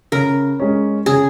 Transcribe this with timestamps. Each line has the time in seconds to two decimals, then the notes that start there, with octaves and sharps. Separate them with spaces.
0.12 C#3 A#4
0.60 G#3 C#4
1.06 C#3 G#4